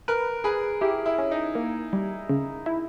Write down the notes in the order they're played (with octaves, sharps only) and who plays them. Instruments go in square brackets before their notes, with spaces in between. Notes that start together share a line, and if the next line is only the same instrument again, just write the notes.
[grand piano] A#4 [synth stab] B4
[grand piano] G#4 [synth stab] B4
[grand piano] E4 [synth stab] G4
[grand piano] E4
[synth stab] C#4
[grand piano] D#4
[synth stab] A#3
G3
C#3
E4